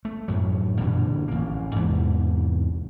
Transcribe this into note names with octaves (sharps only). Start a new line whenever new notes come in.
A3
F#2 A2 F#3
G2 A#2 D3 E3
A1 A#3
E2 G#2 C3 E3